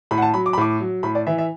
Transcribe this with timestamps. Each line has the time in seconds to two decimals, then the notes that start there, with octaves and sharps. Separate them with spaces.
0.11 A2 B5
0.18 F#5
0.22 A5
0.34 F#3 B5
0.46 D6
0.53 B5
0.58 A2 D6
0.80 F#3
1.03 A2 B5
1.15 D5
1.27 E3 E5
1.38 E5